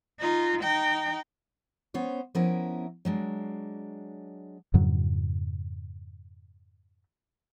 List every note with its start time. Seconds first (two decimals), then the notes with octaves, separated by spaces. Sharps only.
0.20 D#4 F4
0.62 D#4 G5
1.94 B3 C#4 C5 C#5
2.35 F3 B3 C#4 E4 A#4 E5
3.05 F#3 G#3 D4
4.74 F2 G#2 C#3 F#3